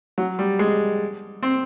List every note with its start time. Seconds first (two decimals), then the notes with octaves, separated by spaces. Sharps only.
0.18 F#3
0.39 G3
0.59 G#3
1.43 C4